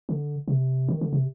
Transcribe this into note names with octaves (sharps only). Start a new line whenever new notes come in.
D3
C3
D#3
D3
C3